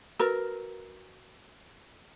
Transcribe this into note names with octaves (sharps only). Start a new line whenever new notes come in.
F#4 A#4 B4 F6